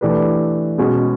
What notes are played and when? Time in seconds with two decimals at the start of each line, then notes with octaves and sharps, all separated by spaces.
0.01 E3 A3 D4 G4 B4
0.78 B2 G#3 C#4 F#4